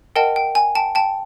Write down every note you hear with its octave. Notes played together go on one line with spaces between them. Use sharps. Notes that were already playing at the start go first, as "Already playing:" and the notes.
A#4 D#5 F#5 G5 A5
G5
G#5
G5 A5
G5 A5